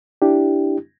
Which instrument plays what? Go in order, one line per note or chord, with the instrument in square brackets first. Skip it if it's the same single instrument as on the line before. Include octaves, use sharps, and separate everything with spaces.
[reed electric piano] D4 E4 G4